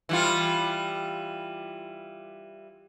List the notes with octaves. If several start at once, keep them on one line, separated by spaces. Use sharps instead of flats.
E3 G3 F4